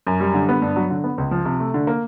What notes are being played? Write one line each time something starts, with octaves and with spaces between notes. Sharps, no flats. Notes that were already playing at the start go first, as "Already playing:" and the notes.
F#2
G3
D3
B3
G2
F#3
D3
B3
C#2
F3
C3
A3
D3
A#3